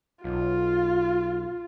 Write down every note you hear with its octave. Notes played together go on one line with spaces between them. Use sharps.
B1 F4